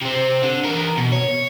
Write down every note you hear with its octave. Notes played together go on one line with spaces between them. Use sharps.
C3 C4
D3
E3 A#4
B2
C#5